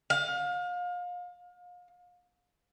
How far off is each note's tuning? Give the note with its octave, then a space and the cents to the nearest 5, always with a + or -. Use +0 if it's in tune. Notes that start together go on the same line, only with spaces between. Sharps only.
F5 +35